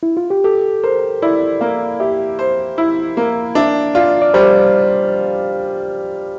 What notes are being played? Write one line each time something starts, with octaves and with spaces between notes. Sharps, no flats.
E4
F4
G4
G4 A4
A#4 C5
E4 D5
A#3 F5
G4 E5
C5
E4
A#3
D4 E5
F4 D5
D5
G3 C5